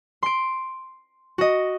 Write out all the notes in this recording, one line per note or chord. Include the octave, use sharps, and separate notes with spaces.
C6 D7
F#4 D#5